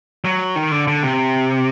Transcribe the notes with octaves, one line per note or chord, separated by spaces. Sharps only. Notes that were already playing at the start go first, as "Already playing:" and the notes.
F#3
D#3
D3
D3
C3